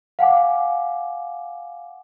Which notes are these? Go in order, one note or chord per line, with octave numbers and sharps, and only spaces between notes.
F5 F#5 G#5 D6